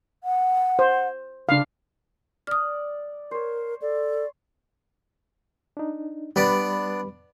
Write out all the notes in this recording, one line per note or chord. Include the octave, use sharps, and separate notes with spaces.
F#5
C5
C#3 D4 F5
D5 D#6 F6
A#4 C5 C#5
A4 D5
D4 D#4
G3 B3 D4 B4 D5 B5